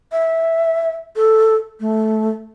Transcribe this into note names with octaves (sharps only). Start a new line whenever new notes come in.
E5
A4
A3